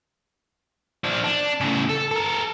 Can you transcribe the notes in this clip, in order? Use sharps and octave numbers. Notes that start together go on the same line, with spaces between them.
F3 D4
D4
A2 C#3
A4
A4 A#4